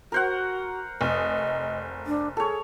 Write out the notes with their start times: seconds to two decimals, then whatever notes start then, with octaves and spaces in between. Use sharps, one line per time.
0.12 F#4 A#4 C5 F#5
1.01 F1 D#5
2.07 D4
2.37 G#4 A4 C#5